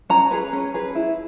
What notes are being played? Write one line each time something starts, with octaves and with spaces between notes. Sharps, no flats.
C#4 A#5
G#4 B4
C#4
G#4 B4
E4